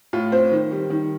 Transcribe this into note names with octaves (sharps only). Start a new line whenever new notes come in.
A2 F4
C4 C5
D#3
G3
D#3